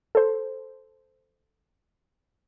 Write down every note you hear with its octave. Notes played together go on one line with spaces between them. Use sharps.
A4 C5